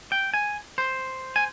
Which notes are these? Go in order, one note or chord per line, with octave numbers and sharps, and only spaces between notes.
G5
G#5
C5
G#5